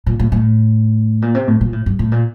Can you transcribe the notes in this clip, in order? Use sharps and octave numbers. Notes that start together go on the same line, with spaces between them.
A#2
A2
A2
A#2
C3
A2
A#2
A2
G2
A2
A#2